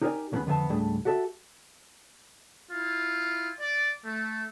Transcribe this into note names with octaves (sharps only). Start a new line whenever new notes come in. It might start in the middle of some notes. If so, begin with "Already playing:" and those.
D#4 G4 A#4 C5 D5 G#5
D#2 C#3 G#3 B3 C#4 B5
F2 D3 B3 C4 E5 A5
C#2 G#2 G3 A3 D4 G#4
F#4 G4 A4 E5
E4 F4
D5
A3